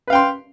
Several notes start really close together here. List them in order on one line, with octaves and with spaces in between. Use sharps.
B4 F5 G5 C6